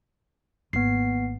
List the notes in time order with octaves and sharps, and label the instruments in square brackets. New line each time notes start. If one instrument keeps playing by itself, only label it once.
[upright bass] G#1 A#3 [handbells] B3 C7